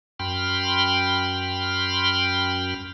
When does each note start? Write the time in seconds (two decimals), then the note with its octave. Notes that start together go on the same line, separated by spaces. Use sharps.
0.19 F#2 G5 B5 C6 F6